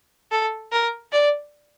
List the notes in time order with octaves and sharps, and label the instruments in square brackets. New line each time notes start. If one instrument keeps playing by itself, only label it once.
[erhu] A4
A#4
D5